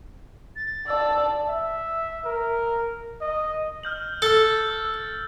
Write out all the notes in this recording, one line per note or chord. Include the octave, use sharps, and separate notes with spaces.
A6
D5 A5 E6
E5
A#4
D#5
F6 G6 F#7
A4 E6 A6
E6